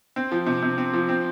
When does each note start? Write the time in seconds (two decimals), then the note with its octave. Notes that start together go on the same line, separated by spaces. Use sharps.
0.16 C4
0.32 F3
0.47 C3
0.63 C3
0.78 C4
0.94 F3
1.09 C4